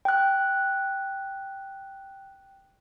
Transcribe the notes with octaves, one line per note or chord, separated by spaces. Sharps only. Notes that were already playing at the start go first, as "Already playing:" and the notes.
G5 F#6